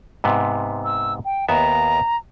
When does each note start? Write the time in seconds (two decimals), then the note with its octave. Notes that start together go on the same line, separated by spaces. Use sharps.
0.24 G#2 C3 B3
0.85 E6
1.25 G5
1.48 D#2 B3 E5 A#5